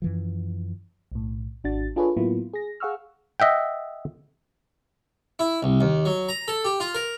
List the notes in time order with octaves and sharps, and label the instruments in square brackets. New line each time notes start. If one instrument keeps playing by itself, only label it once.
[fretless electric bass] F#2 E3 F3
[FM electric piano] B1 A2
G#1 D4 F#4 A6
D4 F4 G#4 A4 B4 C#5
A2 F#3 A#3 B3 E4 F4
G#4 A#6
G#4 F5 F#5 C#6 E6 F6
[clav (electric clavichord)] D#5 E5 F#5 G5
[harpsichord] E4
C2
D#2
F#3
A#5
A4
G4
F4
A#4